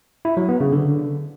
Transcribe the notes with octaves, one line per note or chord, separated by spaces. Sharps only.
E4
F#3
B3
C#3
D3